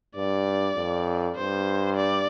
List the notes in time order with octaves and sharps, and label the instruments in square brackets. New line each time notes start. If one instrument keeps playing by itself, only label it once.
[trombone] G2 [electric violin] D5
[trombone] F2
[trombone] G2 [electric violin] C5
[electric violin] D5